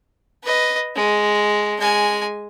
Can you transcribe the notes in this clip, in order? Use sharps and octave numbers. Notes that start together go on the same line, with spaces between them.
B4 D#5
G#3
G#3 G#5